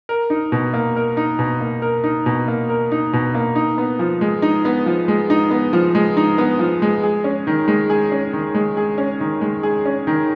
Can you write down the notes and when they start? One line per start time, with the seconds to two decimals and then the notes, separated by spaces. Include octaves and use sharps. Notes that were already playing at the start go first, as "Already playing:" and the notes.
0.09 A#4
0.30 D#4
0.52 B2
0.73 A#3
0.96 A#4
1.17 D#4
1.39 B2
1.60 A#3
1.82 A#4
2.04 D#4
2.26 B2
2.48 A#3
2.69 A#4
2.91 D#4
3.13 B2
3.35 A#3
3.56 D#4
3.78 B3
3.99 F3
4.21 G#3
4.42 D#4
4.65 B3
4.86 F3
5.08 G#3
5.30 D#4
5.51 B3
5.73 F3
5.95 G#3
6.17 D#4
6.38 B3
6.59 F3
6.82 G#3
7.03 G#4
7.24 C#4
7.47 D#3
7.68 G#3
7.90 G#4
8.12 C#4
8.33 D#3
8.55 G#3
8.77 G#4
8.98 C#4
9.20 D#3
9.41 G#3
9.63 G#4
9.86 C#4
10.07 D#3